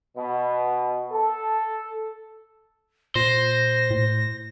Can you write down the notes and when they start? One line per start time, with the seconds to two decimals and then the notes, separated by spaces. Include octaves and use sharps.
0.16 B2
1.12 A4
3.16 A#2 C5 A#6
3.91 A2